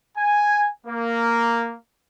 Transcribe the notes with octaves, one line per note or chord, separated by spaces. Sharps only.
G#5
A#3